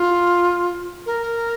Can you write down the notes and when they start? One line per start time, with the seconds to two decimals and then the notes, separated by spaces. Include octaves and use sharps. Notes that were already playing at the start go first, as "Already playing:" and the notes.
Already playing: F4
1.06 A#4